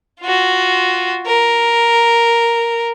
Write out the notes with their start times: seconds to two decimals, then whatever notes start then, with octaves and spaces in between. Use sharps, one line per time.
0.21 F4 F#4
1.26 A#4